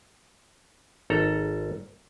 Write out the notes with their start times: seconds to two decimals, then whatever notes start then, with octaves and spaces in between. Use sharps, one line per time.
1.10 G#1 A4 A#5